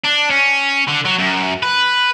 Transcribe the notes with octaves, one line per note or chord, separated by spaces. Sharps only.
D4
C#4
D3
F#3
F#2
B4